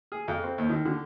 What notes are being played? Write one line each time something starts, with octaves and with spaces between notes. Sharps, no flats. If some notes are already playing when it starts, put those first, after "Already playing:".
G#4
F2
C4
D#2
D#3
D3